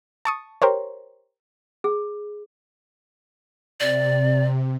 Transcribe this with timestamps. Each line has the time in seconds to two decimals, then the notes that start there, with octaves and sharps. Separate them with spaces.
0.25 A5 C#6 D#6
0.62 G4 A#4 C5 C#5
1.84 G#4
3.80 C3 D5